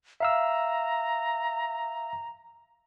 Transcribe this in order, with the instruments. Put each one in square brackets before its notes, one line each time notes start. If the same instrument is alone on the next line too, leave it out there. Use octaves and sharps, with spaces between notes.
[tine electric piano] E5 F5 E6 [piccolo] A#5